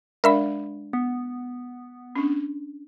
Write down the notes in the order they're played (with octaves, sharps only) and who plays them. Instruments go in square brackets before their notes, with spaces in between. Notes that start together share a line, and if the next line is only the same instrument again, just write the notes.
[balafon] G#3 D4 D5 [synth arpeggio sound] A#4 E5 B5
[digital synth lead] B3
[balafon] C#4 D4